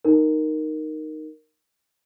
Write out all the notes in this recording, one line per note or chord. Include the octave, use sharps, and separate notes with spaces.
D#4 A#4